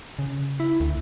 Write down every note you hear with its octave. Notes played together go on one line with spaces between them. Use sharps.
C#3
E4
D2